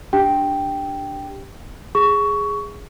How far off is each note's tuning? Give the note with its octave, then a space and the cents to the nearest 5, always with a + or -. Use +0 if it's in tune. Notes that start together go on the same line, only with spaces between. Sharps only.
D4 +0 G4 +0 G5 +0
G#4 -5 C#6 +15